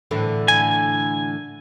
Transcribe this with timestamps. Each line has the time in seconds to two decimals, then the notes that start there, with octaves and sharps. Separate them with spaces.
0.11 A2 D3 E3
0.48 G#5